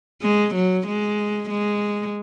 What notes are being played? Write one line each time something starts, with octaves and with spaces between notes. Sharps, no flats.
G#3
F#3
G#3
G#3